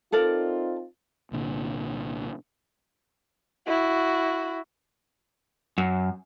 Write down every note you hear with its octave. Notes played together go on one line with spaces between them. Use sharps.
C4 D#4 F4 A4 A#4 D5
C2 A#2 D3
E4 F#4
F#2